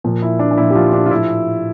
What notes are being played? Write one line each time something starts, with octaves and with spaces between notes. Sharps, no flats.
A#2 F3
E4
D4
D4
A#2 F3 E4
G4
F3 F4
D4
F4
A2 F3 E4